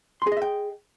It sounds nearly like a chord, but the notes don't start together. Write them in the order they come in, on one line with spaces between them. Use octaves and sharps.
C6 G#4 D#5 E5 G5